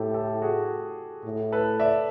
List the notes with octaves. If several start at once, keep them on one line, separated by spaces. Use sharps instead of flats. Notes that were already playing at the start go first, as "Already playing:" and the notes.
Already playing: A2 G4 A4
G4 A4
F#4 G#4
A2
A4 B4
D5 E5